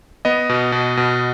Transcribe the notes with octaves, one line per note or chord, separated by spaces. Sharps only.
B3 D#5
B2
B2
B2